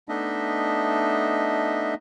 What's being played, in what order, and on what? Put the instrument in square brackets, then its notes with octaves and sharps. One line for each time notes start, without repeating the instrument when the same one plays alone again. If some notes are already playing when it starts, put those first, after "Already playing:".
[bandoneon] A3 B3 D4 D#4 D#5 E5